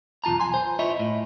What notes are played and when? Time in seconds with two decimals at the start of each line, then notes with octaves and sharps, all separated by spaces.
0.24 B1 E2 F4 A5 A#5
0.40 G#5 C6
0.54 C5
0.79 E4 F4 C#5 D#5 E5
0.99 A2